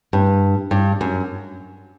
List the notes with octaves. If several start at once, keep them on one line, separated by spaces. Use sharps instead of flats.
G2
G2
F#2